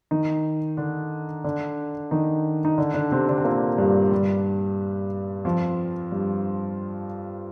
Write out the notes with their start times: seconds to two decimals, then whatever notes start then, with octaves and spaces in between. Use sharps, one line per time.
0.11 D#3 D#4
0.77 D3 D4
1.44 D3 D4
2.11 D#3 D#4
2.65 D#4
2.78 D3 D4
2.94 D3 D4
3.12 C3 C4
3.28 D3 D4
3.38 C4
3.44 A#2 A#3
3.78 G2 G3
4.12 G2 G3
5.45 F2 F3
6.12 G2 G3